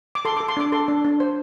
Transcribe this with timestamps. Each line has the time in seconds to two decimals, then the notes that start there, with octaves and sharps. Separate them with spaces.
0.15 D6
0.25 A4 C6
0.37 D6
0.41 A4
0.48 C6
0.57 D4 D6
0.72 A4 C6
0.88 D4
1.04 D4
1.20 C5